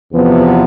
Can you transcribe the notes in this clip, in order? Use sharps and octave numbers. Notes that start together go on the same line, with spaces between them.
E2 C3 F3 B3